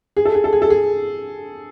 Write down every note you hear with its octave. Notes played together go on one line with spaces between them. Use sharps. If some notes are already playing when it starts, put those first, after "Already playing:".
G#4
A4
G#4
A4
G#4
A4
G#4